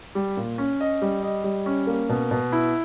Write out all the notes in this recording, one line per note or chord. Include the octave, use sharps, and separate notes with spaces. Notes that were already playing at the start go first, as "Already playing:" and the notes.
G3
A#2
C#4
D#5
G3
D#5
G3
C#4
A#3
B2
B2
E4